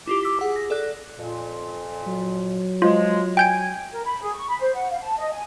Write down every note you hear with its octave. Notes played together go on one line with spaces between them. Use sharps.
E4 F4 G4 D6
D6 E6 B6
G#4 F#5
A#6
A4 D5 F#6
F2 A#2
F#3
F3 G#3 F4
G5 G#5 G6 D7
A#4
B5
G#4
C#6
B5
C5
F#5
F5
A5
D#5
G#5